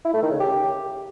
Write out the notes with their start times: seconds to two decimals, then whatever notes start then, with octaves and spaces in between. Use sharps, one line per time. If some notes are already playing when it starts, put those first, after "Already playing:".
0.05 E4
0.14 A3
0.22 D#3
0.31 C#3
0.40 G4